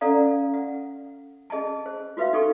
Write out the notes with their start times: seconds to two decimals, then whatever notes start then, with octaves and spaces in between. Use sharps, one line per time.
0.01 C#4 A4 D5 F5 F#5 A#5
0.54 F#5
1.50 G#4 D#5 G#5 A5
1.86 C5
2.17 F4 F#4 B4 E5 F5
2.33 D#4 A4 G5 C#6